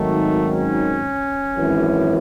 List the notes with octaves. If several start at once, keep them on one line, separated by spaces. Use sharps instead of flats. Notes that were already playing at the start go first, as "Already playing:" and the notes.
Already playing: G#1 G#2 D#3 F#3 A3
C#4
G#1 F#2 E3